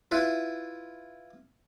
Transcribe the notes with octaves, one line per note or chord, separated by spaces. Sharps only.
E4 F4 B4